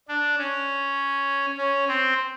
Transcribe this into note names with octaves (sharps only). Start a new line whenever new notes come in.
D4
C#4
C#4
C4